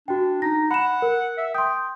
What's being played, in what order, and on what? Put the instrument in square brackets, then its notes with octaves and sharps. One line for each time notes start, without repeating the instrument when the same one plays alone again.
[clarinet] D4 [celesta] F#4 G5
[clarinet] D#4 [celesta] A#6
[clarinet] F#5 [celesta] B5 E7
[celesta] A#4
[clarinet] E5
[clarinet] G5 [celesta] C6 D#6